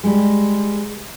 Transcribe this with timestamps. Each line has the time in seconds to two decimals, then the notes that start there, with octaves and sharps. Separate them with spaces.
0.04 G3 G#3